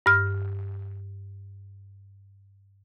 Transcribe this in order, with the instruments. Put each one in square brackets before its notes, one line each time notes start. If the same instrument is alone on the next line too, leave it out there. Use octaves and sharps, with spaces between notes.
[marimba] G2 F6